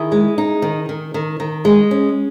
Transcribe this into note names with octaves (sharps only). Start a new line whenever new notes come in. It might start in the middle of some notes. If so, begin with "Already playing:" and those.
Already playing: D#3 E4 G#4
G#3
D#4
D#3
D#3
D#3
D#3
G#3
C#4